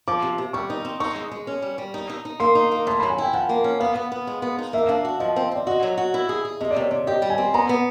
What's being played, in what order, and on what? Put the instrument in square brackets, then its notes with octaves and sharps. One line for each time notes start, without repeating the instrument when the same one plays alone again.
[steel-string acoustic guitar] F3 [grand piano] D6
[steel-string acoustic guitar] C3
C3
[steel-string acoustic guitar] G3 [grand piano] C#6
[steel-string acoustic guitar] D#4
C4
[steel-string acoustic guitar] D#4 [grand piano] C#6
[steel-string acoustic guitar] G#3
G#3
C#4
G3
G3
D#4
D#4
D#4
[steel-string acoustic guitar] A#3 [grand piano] C6
[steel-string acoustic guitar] D#4
A#3
[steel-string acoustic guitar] A2 [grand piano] C6
[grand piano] B5
[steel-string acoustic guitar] F#3
[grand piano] G#5
[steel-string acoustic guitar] E4 [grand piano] G5
[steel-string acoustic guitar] F3 [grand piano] F#5
[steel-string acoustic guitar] A#3
C#4
[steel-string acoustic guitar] B3 [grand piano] F5
[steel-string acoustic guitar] B3
B3
G#3
B3
D#4
[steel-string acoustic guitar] A#3 [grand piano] E5
[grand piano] F5
[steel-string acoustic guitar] D4 [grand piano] E5
[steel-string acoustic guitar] F#4
[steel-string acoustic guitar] F3 [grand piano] D#5
[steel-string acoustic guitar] C4
[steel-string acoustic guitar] C4 [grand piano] D5
[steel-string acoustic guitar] F#4 [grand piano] D#5
[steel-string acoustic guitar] F#3
F#4
E4
G#4
G#4
[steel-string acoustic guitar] C3 [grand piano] D#5
[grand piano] D5
[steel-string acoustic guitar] C3 [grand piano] C#5
[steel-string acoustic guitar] C3 [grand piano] D5
[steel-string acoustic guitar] G4 [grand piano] D#5
[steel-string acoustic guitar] G3
[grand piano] G#5
[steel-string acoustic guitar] C4
[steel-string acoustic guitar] B3 [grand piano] A#5
[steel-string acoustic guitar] B3